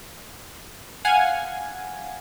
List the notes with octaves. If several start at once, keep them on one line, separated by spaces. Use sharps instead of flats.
F5 F#5 G#5